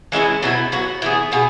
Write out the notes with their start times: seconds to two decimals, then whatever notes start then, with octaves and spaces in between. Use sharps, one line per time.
0.12 E3 G#3 C#4 E4
0.42 B2 F#3 B3 E4
0.72 F#3 B3 F#4
1.02 E3 B3 G#4
1.32 B2 B3 G#4